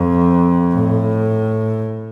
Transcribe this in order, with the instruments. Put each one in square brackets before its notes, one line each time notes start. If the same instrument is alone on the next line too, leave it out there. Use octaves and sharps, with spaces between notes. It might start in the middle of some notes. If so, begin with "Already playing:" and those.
Already playing: [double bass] F2
A2